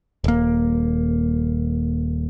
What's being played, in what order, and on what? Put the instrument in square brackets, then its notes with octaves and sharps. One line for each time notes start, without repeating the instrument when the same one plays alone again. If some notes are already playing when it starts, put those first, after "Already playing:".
[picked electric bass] D#1 A#3